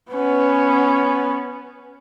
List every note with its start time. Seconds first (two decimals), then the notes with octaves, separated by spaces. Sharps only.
0.11 B3 C#4